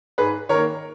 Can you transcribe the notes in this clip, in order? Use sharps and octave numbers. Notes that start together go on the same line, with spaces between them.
G#2 G#4 B4
D#3 A#3 A#4 C#5